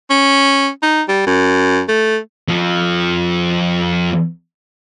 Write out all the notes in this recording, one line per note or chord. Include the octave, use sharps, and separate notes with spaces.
C#4
D#4
G3
F#2
A3
F2 F3